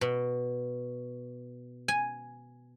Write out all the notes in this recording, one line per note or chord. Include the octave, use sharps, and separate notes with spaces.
B2
G#5